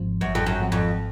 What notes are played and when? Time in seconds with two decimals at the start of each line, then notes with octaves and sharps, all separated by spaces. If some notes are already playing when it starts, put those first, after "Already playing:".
Already playing: G#1 G#2 F3 C4
0.21 G#1 F#2
0.35 F2
0.46 F#2
0.59 G#2 F3 C4
0.72 F2